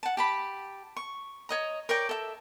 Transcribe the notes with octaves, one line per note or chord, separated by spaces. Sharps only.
F#5 A5
G4 A5 B5
C#6
C#5 D#5 A#5
A#4 C#5 D5 G5
A4 E5